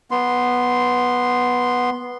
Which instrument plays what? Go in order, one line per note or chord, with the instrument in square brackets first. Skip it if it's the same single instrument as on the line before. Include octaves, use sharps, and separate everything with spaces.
[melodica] B3 C6